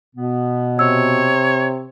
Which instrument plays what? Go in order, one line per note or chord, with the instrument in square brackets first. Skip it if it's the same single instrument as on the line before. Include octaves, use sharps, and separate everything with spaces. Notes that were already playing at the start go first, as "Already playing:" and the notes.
[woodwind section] B2 B3
[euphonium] C3 [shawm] C#5 [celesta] E6